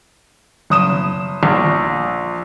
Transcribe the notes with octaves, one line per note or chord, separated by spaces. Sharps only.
F#1 D#6 E7
A#1